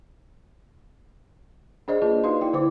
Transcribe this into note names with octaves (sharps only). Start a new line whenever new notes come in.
D4 G#4 C5 D5 D#5
A#3 F4 G#4 B4 A5
D#4 F#4 B4 D5 F5 C6
E4 G5
D3 E4 C5 D6